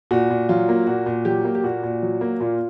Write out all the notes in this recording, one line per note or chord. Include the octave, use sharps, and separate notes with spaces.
A#2 F#4
A#2
F#3 F4
A#3
A#2 F#4
A#2
F#3 G4
A#3
G4
A#2 F#4
A#2
F#3
A#3
A#2 F4